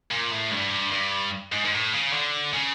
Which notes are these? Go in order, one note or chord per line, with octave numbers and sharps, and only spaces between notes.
A#2
A2
G2
G2
G#2
G#2
A2
C#3
D3
C#3